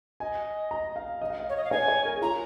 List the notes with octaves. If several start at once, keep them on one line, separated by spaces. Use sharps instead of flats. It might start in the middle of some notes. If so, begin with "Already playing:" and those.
D#5 G#5
A#5
F5
D#5
F5
D#5
C#5
D#5
F5
C#5 G#5
C#5
A#4
G#4
F4 A#5